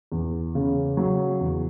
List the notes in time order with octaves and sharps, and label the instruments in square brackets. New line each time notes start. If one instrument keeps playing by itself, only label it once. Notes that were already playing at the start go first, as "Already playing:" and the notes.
[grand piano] E2
C#3
F#3
E2